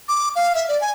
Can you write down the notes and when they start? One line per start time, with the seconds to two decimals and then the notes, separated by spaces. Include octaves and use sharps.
0.09 D6
0.36 F5
0.55 E5
0.69 D5
0.81 G#5